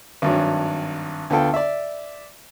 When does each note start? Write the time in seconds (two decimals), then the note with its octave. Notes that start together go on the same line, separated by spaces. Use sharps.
0.22 G#1 G2 F#3
1.30 D2 B3 F4 A4 G5
1.54 D5 E5